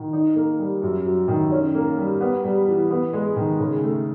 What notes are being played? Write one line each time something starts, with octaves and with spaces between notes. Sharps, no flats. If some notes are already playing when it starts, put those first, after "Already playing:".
Already playing: D#3
D#4
A#3
G3
F#2
F#3
D#3
C#4
A#3
G3
B3
G3
E3
B3
G#3
D#3
C#3
A3